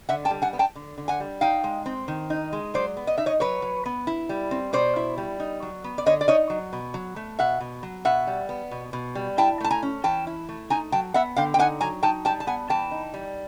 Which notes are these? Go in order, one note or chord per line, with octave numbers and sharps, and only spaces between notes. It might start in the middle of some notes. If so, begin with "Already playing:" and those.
D3 E5 F#5
G5 A5
G3
F#5 G#5
B3
G5 A5
D3
D3
F#5 G#5
G3
D#4 F5 G5
G#3
C4
D#3
D#4
G#3
F#3 C5 D5
B3
D#5
D#4 E5
C#5 D#5
F#3 B4 C#5
F#3
B3
E4
G3
C4
B2 C5 D5
E4
G3
D#4
F#3
B3
D5
D3 C#5 D#5
D5
D#4 C#5 D#5
F#3
B2
F#3
A3
B2 E5 F#5
B2
F#3
B2 E5 F#5
G3
B3
B2
B2
G3
E4 G5 A5
A3 A5
G#5 A#5
C#4
E3 G5 A5
E4
A3
D#4 G#5 A#5
F#3 G5 A5
B3 E5 F#5
D3 F5 G5
G5
D#4 F#5 G#5
F#3 G#5 A#5
D#4 G5 A5
G3 G5 A5
A5
B3 F#5 G#5
E3 G5 A5
D#4
G3